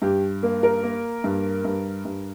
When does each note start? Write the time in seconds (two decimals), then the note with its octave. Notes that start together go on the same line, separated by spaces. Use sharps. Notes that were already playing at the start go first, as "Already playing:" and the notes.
0.02 G2 G4
0.43 A#3
0.63 A#4
0.83 A#3
1.24 G2
1.65 G2
2.05 G2